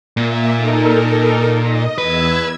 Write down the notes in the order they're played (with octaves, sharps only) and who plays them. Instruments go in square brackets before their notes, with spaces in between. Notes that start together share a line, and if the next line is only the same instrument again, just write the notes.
[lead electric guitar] A#2 [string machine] A#3 E5
[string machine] D#4 A4 A#4
D#5
[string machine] E2 E6 G#6 [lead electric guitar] B4